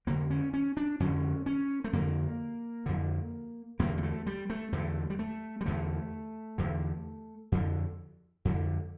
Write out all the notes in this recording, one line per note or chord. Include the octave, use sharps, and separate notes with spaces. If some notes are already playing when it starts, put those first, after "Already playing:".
F2 D3 A#3
C#4
C#4
D4
F2 D3 C#4
C#4
A3
F2 D3 A#3
F2 D3
E2 D3 A#3
G3
A3
G3
A3
E2 D3 A3
G3
A3
G3
E2 D3 A3
E2 D3
F2 D3
F2 D3